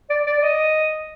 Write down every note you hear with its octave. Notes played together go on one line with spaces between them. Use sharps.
D5
D5
D5
D#5